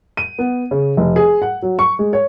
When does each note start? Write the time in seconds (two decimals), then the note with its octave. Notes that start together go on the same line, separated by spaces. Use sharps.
0.17 D#7
0.39 B3
0.71 C#3
0.97 F1
1.16 G#4
1.42 F#5
1.62 F#3
1.79 C#6
1.99 G#3
2.13 C#5